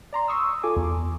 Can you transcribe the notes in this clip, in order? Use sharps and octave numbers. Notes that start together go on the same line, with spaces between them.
D5 A#5 C6
C6 C#6 D#6 E6
F4 A4 G#5 D6
E2